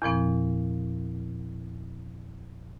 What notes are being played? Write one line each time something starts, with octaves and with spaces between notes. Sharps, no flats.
E2 A#2 F3 C4